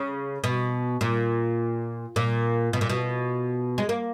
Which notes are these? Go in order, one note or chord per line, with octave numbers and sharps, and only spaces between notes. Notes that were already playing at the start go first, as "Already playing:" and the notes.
Already playing: C#3
B2
A#2
A#2
B2
A#2
B2
G#3
A#3